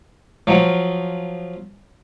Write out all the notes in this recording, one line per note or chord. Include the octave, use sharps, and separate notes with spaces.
F3 F#3